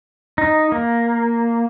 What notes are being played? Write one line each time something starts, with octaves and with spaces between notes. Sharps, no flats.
D#4
A#3